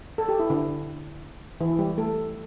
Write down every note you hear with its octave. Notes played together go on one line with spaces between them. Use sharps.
A4
G4
E4
D3 D4
E3 E4
G3 G4
A3 A4